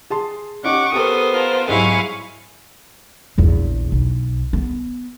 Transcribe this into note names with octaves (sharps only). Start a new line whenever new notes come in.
G#4 A5 C6
C#4 D#4 G4 F#5 C#6 D6
B3 G4 A4 A#4 C5 D#6
F4 A#4 A5
C2 G#2 F#3 G#3 E4 F5 G#5 C#6
A#1 E2
B1
B3